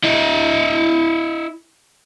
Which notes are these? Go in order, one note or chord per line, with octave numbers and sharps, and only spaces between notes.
E4 D#5